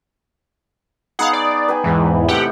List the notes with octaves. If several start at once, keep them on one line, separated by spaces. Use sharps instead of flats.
B3 D#4 G#4 F5 F#5
D5
B4 G5 G#5
E2 G#2 E3
A2 C3 A3 G4 F#5 G5